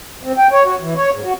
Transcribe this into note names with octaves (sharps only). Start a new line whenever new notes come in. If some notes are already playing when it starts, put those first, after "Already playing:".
C4
G5
C#5
F#4
E3
C#5
G#2
F#4